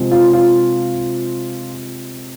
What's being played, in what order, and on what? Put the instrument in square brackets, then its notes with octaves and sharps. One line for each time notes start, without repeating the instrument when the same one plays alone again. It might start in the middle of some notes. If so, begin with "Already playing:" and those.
Already playing: [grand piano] C3 F3 G#3 C4
[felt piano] F4
F4